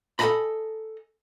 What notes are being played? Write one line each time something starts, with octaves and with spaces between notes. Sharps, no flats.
A4 D#5 E5 G#5 A#5 B5